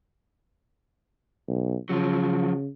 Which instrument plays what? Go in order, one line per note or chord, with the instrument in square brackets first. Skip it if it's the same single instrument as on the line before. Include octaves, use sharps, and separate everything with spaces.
[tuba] B1
[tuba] C#3 [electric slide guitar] F3 F#3